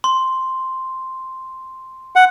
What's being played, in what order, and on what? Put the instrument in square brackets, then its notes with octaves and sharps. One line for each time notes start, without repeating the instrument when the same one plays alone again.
[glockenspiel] C6
[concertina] F#5